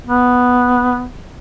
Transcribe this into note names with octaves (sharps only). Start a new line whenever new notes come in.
B3